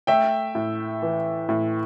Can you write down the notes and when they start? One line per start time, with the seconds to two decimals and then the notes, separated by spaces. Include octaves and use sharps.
0.07 A3 E5 G5
0.55 A2
1.02 E3
1.49 A2